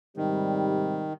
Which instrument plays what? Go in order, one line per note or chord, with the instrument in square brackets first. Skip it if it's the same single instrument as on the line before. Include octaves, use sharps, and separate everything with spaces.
[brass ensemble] G#2 C3 G3 [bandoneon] D#3